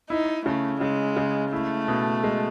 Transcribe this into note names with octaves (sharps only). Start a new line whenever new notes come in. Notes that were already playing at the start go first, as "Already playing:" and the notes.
D#4 E4
C#3 A3
C#3 G#3
C#3
A3 E4
B2
G#3